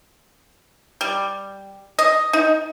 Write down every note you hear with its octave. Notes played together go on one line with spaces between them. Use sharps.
G3
D#5
D#4